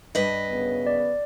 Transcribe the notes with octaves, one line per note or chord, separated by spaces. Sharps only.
G2 B4 D#5
F#2 C#3 B3
D5